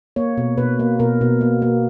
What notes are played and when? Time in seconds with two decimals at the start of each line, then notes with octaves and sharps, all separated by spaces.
0.16 A#3 C#5
0.38 B2
0.58 B2 B4
0.80 A#3
0.99 B2 A#4
1.21 B2
1.41 A#3
1.62 A#3